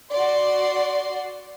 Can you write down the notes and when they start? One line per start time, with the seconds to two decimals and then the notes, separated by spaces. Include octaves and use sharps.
0.11 F#4 D5 C6